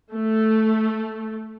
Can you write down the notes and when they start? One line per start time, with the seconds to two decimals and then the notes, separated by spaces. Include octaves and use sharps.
0.12 A3